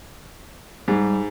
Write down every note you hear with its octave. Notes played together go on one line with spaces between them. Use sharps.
G#2 G3